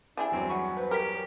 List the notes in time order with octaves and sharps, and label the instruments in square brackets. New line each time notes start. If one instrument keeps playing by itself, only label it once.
[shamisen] G3 E4 G#4 [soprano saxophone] D4 [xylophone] G#5
[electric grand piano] E2 G2 F#3 [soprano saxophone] C4
[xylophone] F#5 G#5 C#6 [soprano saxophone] B5
[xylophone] B4 C5
[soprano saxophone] G4 [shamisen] A#4 [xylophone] F6 B6